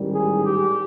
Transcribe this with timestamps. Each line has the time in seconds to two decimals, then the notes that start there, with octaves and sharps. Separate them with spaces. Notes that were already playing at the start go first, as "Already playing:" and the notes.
Already playing: A1 G#2 D#3 G3
0.13 G#4
0.43 G4